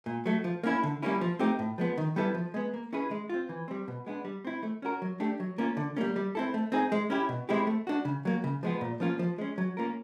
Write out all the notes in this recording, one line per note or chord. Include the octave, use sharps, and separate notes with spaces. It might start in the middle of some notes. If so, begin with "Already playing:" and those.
A#2
F#3 A3
F3
A#3 C#4 E4
D3
G3 A#3 C#4 E4
F3
A3 C4 D#4 G4
A2
F3 G#3 B3
D#3
G3 B3 E4 A4
F3
G#3 B3
A#3
C#4 E4 G#4 B4
G#3
C4 F4
E3
G3 C4
B2
G#3 B3 D4
G3
C4 E4
A3
C#4 F#4 A#4
F#3
A3 D4 G4
F#3
A#3 C#4 F4
D3
G3 A#3 C#4
G3
C4 E4 A4
A3
C4 D#4 G#4
G#3
C#4 E4 G4
B2
G#3 C4 E4 G4
A3
D4 F#4
C#3
F#3 A#3
C#3
F3 G#3 B3
A#2
F3 A#3 C#4 F4
F3
G#3 C#4
F#3
A#3 C#4 F4 A#4